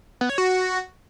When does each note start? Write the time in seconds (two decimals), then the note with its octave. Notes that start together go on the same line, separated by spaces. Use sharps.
0.21 B3
0.29 C#5
0.38 F#4